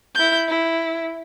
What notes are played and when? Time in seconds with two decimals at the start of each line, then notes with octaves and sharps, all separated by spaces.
0.15 E4 G6
0.49 E4